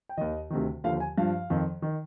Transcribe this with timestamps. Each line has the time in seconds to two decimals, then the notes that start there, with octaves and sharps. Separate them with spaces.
0.09 G5
0.17 D#2 D#3 D#5
0.50 D2 C3 D#3
0.84 D#2 D3 F3 F5
1.00 G#5
1.18 G2 F3 F5
1.50 F2 D#3
1.82 D#3